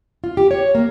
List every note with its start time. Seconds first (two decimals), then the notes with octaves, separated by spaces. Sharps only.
0.24 F4
0.37 G4
0.51 C#5
0.75 A#3